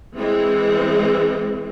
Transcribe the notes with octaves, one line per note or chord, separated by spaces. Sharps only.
E3 G#3 C4